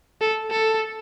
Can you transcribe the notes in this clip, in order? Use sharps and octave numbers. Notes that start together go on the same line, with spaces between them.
A4
A4